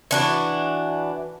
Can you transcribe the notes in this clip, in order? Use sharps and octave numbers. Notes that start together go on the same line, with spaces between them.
E3 D4 F#4